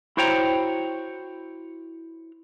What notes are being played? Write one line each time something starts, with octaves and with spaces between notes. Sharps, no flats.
E4 F#4 C5 C#5 G5 A#5